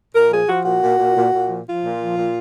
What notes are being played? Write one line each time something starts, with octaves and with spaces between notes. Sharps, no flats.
A#2 A#4
F3 G#4
F3 F#4
A#2 F#4
A#2
A#2
A#2
A#2
F3
F3 F4
A#2
F3
A#2